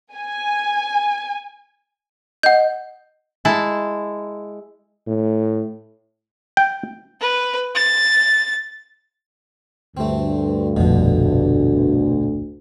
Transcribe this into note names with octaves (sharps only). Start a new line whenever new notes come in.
G#5
D#5 F#5 G6
G#3 E4 A5
A2
G5
B4
A6
D2 G2 A3 C4
F1 A#1 F2 B2 D3